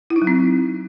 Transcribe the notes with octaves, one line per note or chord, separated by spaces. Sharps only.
E4
D#4
F#3
C4